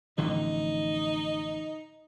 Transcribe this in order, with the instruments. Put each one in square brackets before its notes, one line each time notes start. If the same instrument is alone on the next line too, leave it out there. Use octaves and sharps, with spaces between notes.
[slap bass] A1 D3 F3 [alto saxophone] D#4